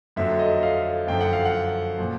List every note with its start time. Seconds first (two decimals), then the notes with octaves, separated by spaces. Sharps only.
0.16 F2 D3 F#3 E5
0.39 D#5
0.63 F5
1.07 F#2 D3 F3 G5
1.21 F#5
1.33 F5
1.45 F#5
1.99 A#2 F3